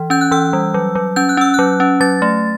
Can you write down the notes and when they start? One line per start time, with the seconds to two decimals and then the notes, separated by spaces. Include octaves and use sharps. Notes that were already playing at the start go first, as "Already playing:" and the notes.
Already playing: E3
0.10 C#4 G6
0.21 F#6
0.31 E3 E6
0.53 G3
0.74 F#3
0.95 F#3
1.16 C#4 G6
1.29 F#6
1.37 C#4 E6
1.54 F#3 F#6
1.80 C#4
2.00 F#3 A6
2.22 A3